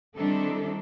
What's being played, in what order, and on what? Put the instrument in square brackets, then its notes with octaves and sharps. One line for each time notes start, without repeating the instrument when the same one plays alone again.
[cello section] D#3 G3 C4 D4 E4 A4